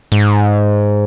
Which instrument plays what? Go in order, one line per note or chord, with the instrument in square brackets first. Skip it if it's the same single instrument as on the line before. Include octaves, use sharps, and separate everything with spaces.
[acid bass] G#2